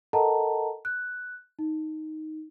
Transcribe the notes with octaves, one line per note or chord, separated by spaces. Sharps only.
A4 A#4 D#5 F#5 A5 A#5
F#6
D#4